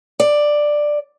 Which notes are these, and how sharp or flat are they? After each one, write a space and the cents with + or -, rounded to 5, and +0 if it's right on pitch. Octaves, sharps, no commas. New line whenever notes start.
D5 +10